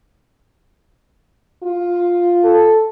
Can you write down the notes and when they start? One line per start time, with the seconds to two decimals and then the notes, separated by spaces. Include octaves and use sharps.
1.63 F4
2.43 A4